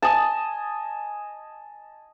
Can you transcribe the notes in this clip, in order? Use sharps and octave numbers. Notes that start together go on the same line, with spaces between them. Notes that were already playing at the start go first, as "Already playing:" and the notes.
D#5 G#5 A5